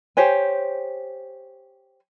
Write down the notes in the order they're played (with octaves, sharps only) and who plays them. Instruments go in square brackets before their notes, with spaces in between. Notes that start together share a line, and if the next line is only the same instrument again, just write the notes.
[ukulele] G4 C5 C#5 G#5